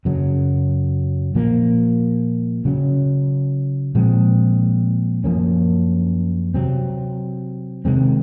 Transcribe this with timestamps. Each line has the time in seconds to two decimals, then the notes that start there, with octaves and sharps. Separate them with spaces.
0.05 F#2 C#3 F#3
1.35 A#2 F3 A#3
2.65 C#3 F#3 C#4
3.95 A#2 F3 G#3 C4
5.24 F#2 F3 A#3 C#4
6.54 C3 F#3 C4
7.85 C3 D#3 G#3 C4